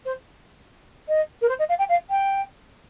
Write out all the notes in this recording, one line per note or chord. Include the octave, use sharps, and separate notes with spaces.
C5
D#5
A#4
C5
D#5
F5
G5
F5
G5